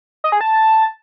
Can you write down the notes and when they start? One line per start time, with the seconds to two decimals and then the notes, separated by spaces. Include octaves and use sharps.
0.24 D#5
0.32 G#4
0.41 A5